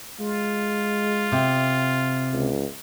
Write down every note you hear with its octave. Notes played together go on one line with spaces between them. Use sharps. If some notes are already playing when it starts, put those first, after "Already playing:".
G#3 F4
C3
C#2